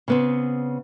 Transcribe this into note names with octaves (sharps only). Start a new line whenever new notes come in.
C#3 B3 C4